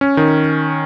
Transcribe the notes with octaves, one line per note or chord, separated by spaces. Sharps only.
C#4
D#3